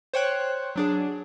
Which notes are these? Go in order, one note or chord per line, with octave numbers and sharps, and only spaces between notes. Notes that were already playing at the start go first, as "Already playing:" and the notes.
C5 C#5 G5 F#6
F#3 D4 G#4